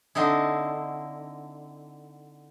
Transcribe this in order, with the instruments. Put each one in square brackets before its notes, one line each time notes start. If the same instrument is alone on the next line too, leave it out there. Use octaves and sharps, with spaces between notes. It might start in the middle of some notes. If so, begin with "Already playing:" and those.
[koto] D3 C4 D#4 E4